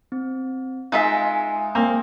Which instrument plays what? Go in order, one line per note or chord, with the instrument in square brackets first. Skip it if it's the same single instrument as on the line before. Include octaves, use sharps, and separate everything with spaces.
[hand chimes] C4
[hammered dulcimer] G#3 [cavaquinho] D#4 F4 E5 [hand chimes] F5 G#5
[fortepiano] A#3 [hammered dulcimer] C4